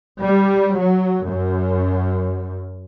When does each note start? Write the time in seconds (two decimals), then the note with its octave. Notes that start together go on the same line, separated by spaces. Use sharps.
0.23 G3
0.78 F#3
1.28 F#2